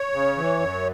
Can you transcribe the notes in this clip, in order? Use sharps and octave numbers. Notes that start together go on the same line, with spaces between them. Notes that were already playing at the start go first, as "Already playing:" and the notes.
Already playing: C#5
C#3
E3
F#2